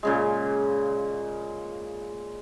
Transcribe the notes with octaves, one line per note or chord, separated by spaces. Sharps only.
A#2 C#3 G#3